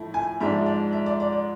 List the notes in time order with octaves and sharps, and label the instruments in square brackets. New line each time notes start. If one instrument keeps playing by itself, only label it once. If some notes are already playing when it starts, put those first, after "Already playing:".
Already playing: [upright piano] A2 F3 E4
G#5
G#2 F3 G#3 D4 E5
D5
E5
D5
D5
D5